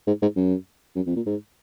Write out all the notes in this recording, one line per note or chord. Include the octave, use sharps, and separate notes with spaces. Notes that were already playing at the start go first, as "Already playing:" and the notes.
G#2
G#2
F#2
F#2
F2
A#2
G#2